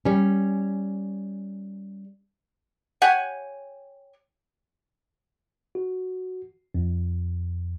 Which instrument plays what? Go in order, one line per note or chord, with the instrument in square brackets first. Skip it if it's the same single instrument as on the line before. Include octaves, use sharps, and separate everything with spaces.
[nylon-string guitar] G3 C#4
[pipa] G4 C#5 F#5 G#5
[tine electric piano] F#4
F2